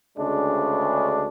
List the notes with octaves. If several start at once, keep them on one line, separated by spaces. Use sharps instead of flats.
D2 C#3 G#3 D4